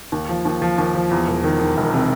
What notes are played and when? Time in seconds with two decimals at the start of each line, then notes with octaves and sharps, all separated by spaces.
0.12 D#2
0.29 F3
0.45 D#2
0.62 F3
0.78 D#2
0.95 F3
1.11 E2
1.27 E1
1.44 D#3
1.60 D#3
1.77 E1
1.93 C3